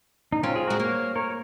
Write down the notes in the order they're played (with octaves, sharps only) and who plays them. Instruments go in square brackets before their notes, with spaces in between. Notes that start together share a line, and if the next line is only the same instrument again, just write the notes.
[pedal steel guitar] D#4
[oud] C4 [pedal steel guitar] C#4 F4
[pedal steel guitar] F4 G#4
[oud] G#3 [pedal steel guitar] F#4 A#4
[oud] A#3 [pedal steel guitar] C#5 F5
[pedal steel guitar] A#4 C#5